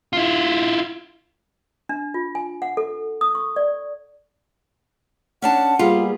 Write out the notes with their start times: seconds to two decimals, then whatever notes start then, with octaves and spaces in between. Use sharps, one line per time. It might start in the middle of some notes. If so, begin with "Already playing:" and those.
0.13 E4 F4
1.89 D4
2.14 F4
2.35 G#5
2.62 F#5
2.77 A4
3.21 D#6
3.35 C#6
3.56 D5
5.42 C#4 D4 F#5 A5
5.79 G3 A#3 B3 F4 G#4